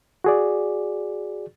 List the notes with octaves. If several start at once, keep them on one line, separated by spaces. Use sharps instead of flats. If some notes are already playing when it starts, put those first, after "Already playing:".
F#4 G#4 D5